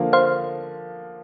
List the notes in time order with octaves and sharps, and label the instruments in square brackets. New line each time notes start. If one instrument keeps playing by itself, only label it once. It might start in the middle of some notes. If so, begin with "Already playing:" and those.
Already playing: [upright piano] D3 F3 A#3
[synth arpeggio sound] C5 F5